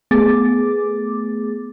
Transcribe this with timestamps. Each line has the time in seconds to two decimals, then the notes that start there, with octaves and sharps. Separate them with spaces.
0.11 A3 B3 G#4 D6 A6